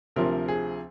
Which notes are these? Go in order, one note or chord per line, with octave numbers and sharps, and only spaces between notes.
D2 C3 F3 C4 A#4
G#4